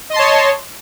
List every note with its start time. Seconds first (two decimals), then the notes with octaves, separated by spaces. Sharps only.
0.10 D#5
0.13 C6
0.16 A5
0.19 C#5